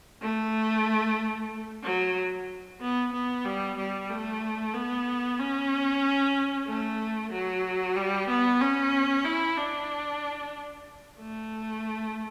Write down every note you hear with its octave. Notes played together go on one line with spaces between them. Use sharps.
A3
F#3
B3
B3
G3
G3
A3
B3
C#4
A3
F#3
G3
B3
C#4
E4
D4
A3